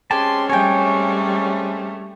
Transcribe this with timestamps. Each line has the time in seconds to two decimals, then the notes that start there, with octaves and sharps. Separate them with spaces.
0.11 G#3 C4 C#4 G4 G#4 A5 C6
0.49 G3 A3 C#5 G5 G#5